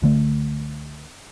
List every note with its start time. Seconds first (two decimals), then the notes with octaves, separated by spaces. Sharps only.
0.02 C#2 D3 A3